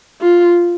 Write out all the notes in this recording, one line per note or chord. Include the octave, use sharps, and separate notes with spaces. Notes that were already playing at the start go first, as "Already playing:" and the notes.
F4